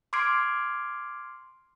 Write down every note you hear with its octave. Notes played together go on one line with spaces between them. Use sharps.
C6 D6 F6 G#6 C7 D7